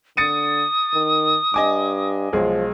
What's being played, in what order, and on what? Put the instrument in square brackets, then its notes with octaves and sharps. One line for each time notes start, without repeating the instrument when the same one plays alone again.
[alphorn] D3 [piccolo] D#6 [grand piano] A6 C#7 D#7
[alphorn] D#3
[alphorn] G2 [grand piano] D#5 G#5 D6
[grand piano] B1 G#3 G#4 [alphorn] F3